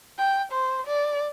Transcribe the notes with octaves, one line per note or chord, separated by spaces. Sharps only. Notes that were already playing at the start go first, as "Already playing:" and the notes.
G5
C5
D5